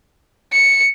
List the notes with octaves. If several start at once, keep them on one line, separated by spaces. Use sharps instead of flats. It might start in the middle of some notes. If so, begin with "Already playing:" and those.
C#7